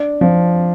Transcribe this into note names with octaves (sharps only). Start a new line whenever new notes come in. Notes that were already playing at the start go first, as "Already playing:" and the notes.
Already playing: D4
F3